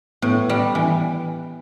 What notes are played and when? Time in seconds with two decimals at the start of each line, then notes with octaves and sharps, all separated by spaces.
0.22 A2 B3
0.49 G3
0.75 E3